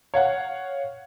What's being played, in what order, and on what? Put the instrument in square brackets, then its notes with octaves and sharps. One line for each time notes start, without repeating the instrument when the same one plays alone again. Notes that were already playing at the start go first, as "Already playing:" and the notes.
[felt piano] C#5 F5 F#5